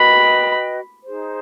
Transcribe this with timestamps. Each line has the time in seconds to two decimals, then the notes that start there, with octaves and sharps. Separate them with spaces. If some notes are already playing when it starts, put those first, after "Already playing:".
Already playing: F#4 B4 D#5 G5 B5
1.04 D#4 G#4 C5